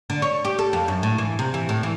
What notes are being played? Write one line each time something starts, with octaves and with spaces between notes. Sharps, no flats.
D3
C#5
G4
A4
F2
F#2
A2
E3
C3
E3
A2
E3